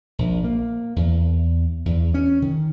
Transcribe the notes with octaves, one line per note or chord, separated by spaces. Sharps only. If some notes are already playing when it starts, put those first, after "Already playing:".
A#1
A#3
E2
E2
C#4
D#3